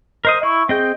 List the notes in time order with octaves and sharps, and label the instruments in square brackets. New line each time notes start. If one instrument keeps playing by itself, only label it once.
[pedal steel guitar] A#4 C5 D#6 [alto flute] D#5
[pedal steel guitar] E4 [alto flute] C#6
[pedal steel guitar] C4 D#5 G5 [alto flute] G#4